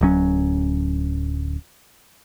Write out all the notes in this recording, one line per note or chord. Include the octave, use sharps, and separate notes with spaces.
D1 F#3 C#4